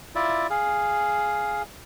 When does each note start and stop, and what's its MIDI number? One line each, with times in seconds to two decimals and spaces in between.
0.15 0.47 64
0.15 0.47 65
0.15 0.47 74
0.15 0.47 76
0.50 1.62 68
0.50 1.62 77